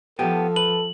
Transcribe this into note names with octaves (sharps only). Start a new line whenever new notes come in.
F3 B3 G4 A4
B4 F#7